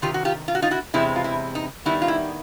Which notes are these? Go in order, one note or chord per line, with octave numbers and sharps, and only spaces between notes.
C3 D#3 F4 G4
F#4
F4 G4
F4
F#4
D#4 F4
E4 F#4
E2 C3 E3 G#3 C4 E4
F4
E4
D#4
D#3 G3 B3 D#4 E4
F4
E4